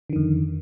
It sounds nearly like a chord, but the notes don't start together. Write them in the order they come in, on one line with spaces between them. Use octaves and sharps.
D3 D#3 F2